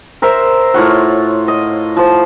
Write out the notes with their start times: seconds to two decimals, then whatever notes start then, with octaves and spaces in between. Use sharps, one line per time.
0.22 A#4 C5 E5
0.74 A2 F4 C#5 F#5
1.48 D#5
1.97 F3 C5